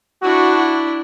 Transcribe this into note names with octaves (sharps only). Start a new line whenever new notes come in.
D4 E4 F#4